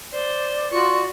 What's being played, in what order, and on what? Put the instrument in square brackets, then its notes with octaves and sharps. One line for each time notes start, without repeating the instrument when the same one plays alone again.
[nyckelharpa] C5 [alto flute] D5
[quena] F4 [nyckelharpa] F#4 C#6